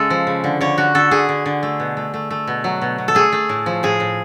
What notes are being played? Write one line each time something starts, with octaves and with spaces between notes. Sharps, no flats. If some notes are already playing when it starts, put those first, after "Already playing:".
Already playing: C#3 G#3 A4
F3
C#3
D3
D3 C#5
D3 F#4
D3 A4
D3 G#4
D3
D3
A3
B2
A3
A3
A3
B2
F#3
B2
B2
A4
A3 G#4
A3
A2
F3
A2 G#4
A2